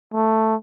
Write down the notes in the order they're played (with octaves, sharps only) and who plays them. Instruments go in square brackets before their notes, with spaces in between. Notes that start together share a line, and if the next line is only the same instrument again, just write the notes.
[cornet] A3